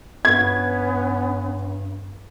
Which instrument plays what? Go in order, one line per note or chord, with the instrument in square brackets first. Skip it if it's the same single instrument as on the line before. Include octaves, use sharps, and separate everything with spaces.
[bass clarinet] G2 [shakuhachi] B3 [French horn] C#4 [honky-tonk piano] G#6